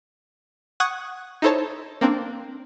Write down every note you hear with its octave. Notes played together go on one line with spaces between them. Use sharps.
F#5 C#6 D#6 F#6 G#6
D#4 E4 A4 C5 C#5 A5
A#3 C4 D4